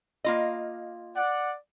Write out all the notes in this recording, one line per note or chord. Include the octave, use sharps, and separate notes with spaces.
A#3 F4 D#5
D5 F#5